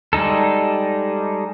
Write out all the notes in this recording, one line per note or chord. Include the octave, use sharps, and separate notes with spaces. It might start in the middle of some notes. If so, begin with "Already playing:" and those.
G3 G#3 D#4 A4